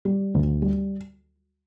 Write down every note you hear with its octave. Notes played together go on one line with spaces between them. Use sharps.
G3
D2
G3